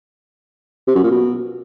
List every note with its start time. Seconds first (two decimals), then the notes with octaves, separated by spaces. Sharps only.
0.88 C3
0.95 F#2
1.03 A#2
1.11 B2